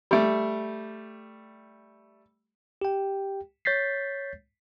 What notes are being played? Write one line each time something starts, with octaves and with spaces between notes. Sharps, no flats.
G3 A3
G4 G5
C#5 G6 A6 B6 C7